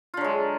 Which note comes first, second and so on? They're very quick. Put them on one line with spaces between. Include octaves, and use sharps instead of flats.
F4 D3 F#3 G#3